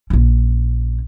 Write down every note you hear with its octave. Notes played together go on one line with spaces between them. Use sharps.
A#1 C#4